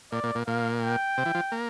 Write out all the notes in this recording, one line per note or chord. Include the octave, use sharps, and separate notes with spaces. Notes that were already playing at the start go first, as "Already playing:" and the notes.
A#2 D5
A#2
A#2
A#2 F5
G5
C3
E3
F3
A#3